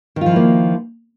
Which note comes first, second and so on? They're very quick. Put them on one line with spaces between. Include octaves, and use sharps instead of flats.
D#3 F4 F3 E4 A#3